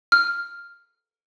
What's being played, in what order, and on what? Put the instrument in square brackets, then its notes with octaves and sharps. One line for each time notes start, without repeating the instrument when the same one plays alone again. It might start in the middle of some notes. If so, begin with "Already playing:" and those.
[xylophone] F6